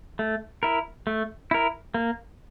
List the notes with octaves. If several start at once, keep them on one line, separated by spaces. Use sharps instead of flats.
A3
E4 A#4
A3
E4 A#4
A#3